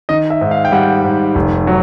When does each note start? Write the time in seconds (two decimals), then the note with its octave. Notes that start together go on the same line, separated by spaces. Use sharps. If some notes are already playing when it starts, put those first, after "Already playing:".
0.09 D#3 D#5
0.30 E5
0.41 G#2
0.51 F5
0.65 G5
0.72 G3 F#5
1.04 G#2
1.35 F1
1.67 F#3